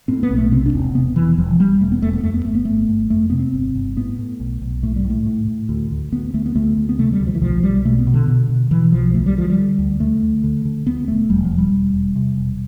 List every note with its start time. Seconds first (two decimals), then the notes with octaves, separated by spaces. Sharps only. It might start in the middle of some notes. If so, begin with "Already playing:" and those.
0.08 A2 C4
0.23 B3
0.31 B1
0.38 A3
0.52 C3 C4
0.66 D4
0.73 E1
0.80 C4
0.95 C3 B3
1.16 E1 E3
1.38 E1 F3
1.60 E1 G3
1.81 E1 A3
1.92 B3
2.02 E1 A3
2.13 B3
2.24 F2 A3
2.34 B3
2.45 G1 A3
2.55 B3
2.65 G1 A3
2.89 G1
3.10 F2 A3
3.30 C3 B3
3.40 C4
3.53 G1
3.76 G1
3.96 A2 B3
4.18 A2
4.40 B1
4.61 B1
4.83 A2 A3
4.96 G3
5.05 A2
5.10 A3
5.26 A2
5.48 A2
5.69 D2
5.91 D2
6.12 D2 B3
6.34 D2 A3
6.46 B3
6.56 D2 A3
6.77 D2
6.89 B3
6.99 C3 A3
7.13 G3
7.20 D2
7.27 F3
7.35 E3
7.42 B1 F3
7.63 B1 G3
7.85 B2 A3
7.99 B3
8.07 B2
8.14 D3
8.28 B2
8.49 B2
8.71 B2 E3
8.92 B1 F3
9.14 D2 A3
9.26 G3
9.36 D3 F3
9.50 G3
9.58 D3
9.79 D2
10.00 D3 A3
10.22 D2
10.44 D3
10.65 D3
10.87 D2 B3
11.08 E1 A3
11.30 E1 G3
11.44 F3
11.51 E1
11.58 G3
11.73 E1
11.94 E1
12.16 C3
12.38 E1